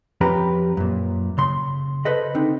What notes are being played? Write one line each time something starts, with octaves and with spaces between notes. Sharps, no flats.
F2 F3 C#4 G4 B4 A#5
F#2 A#2
C#3 C6
A4 B4 C5 D#5
D3 C4 D#4